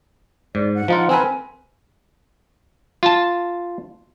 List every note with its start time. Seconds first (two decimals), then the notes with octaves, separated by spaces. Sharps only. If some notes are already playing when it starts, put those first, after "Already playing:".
0.55 G#2 D5
0.75 F#5
0.88 F3 D#4 F4
1.09 C4 A#4 B4 G#5
3.03 F4 A5